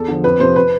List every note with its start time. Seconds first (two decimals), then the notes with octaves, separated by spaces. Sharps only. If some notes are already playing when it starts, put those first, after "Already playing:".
Already playing: E2 A4
0.08 D3 F3
0.24 F2 B4
0.40 C3 F3 C5
0.56 B4